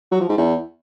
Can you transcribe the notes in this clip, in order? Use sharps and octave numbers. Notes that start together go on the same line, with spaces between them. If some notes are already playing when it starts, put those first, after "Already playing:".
F#3
F3
G#2
E2